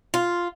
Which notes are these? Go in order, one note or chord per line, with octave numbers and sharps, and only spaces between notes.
F4